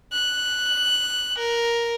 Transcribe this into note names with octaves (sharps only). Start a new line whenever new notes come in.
F#6
A#4